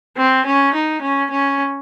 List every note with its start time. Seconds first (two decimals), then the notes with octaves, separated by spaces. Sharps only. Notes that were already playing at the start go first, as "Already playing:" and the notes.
0.17 C4
0.46 C#4
0.74 D#4
1.02 C#4
1.31 C#4